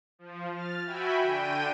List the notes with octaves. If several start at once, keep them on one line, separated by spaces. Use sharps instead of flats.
F3
F6 A6
F#4 E5 G5 G#5 B5
D3 G5 D#7